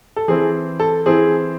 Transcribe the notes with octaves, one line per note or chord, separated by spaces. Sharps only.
A4
E3 C4 E4 G#4
A4
E3 C4 E4 G#4